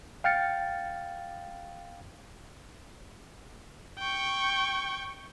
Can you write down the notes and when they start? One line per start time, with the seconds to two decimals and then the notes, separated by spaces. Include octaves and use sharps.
0.24 F5 G5 F6 A6 C#7
3.98 G5 C#6